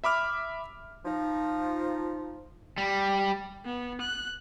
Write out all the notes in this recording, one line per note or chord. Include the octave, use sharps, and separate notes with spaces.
E5 B5 D6 F6
F3 D#4
G3
B3
F#6